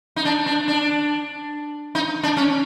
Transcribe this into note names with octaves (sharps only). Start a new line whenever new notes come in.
D#4
D4
D4
D4
D#4
D4
C#4